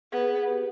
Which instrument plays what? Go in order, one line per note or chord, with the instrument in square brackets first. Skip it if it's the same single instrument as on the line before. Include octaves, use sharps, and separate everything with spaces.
[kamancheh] B3 [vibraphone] G#4
[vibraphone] B4
G4